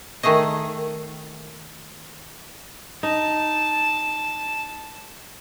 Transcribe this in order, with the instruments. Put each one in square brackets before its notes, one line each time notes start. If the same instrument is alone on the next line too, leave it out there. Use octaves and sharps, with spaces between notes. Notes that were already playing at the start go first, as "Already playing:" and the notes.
[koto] D#3 A3 G#4 D#5
[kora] D#4 [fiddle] A5